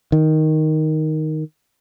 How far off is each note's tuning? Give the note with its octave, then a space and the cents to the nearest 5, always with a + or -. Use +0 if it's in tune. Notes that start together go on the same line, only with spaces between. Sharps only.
D#3 +5